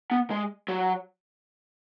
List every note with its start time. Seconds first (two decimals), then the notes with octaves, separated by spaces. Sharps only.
0.11 B3
0.30 G#3
0.68 F#3